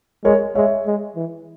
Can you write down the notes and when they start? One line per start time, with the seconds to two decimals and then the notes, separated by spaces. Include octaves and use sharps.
0.24 G#3 A#4 C#5
0.55 G#3 C#5 E5
0.87 G#3
1.16 E3